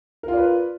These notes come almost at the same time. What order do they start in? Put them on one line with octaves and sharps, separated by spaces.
A#4 F4 D5 B4